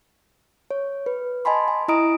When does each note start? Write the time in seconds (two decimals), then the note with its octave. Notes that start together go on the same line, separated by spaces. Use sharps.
0.71 C#5
1.06 B4
1.45 D#5 G#5 A5 B5 C6
1.68 G#5
1.88 E4 D#5 A#5 D#6 D7